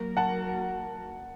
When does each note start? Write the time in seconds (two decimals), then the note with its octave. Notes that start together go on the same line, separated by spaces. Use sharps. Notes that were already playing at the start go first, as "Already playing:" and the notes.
Already playing: F#3 A#3 F#4 A#4
0.17 F#5 A5